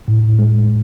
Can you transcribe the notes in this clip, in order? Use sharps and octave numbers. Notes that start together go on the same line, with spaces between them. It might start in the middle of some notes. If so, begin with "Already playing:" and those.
A2
G#3